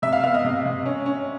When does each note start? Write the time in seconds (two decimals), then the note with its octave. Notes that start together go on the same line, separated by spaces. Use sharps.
0.02 C3 E5
0.13 F5
0.23 B3 F5
0.34 D#5
0.44 C3
0.65 C3
0.85 C#4
1.06 C#4